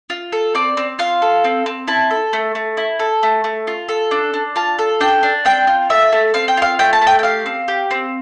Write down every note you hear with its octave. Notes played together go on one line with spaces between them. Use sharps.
F4
A4
C4 D5
C4
F4 F5
A4
C4
C4
E4 A5
A4
A3
A3
E4
A4
A3
A3
F4
A4
D4
D4
F4 A5
A4
D4 G5
D4
C4 G5
F4
A3 E5
A3
C4 F5
G5
F4 F5
A3 G5
A5
A3
G5
G5
G4 F5
C4
G4
C4